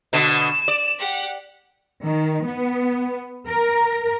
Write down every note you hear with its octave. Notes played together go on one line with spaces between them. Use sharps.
B2 D3 E7
D5
G4 F#5
D#3
B3
A#4